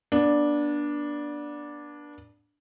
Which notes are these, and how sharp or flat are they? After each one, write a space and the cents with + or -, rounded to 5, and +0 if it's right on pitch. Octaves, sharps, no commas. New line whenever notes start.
B3 -35 D4 +0